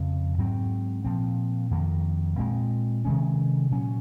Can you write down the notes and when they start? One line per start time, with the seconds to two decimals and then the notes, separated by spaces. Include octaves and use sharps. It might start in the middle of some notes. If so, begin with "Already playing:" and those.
Already playing: F2 C#3 F3
0.38 G#2 F#3 C4
1.04 A#2 F3 C4
1.71 F2 D#3 A#3
2.38 A#2 G#3 C4
3.05 C3 D#3 G#3 C#4
3.71 A#2 F#3 C#4